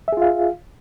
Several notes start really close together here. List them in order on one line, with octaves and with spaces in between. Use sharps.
E5 G#4 F4 F5